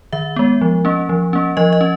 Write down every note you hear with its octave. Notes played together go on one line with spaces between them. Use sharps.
D#3 E5
G#3 B3
F3
A#3 C#4
F3
A#3 C#4
F3 D#5
D#5
C#4